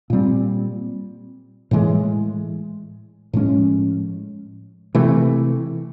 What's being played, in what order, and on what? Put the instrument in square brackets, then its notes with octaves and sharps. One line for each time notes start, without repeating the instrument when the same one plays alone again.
[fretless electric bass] A#2 G3 C4
A2 E3 G#3
A2 F3 G#3 C#4
C3 E3 A3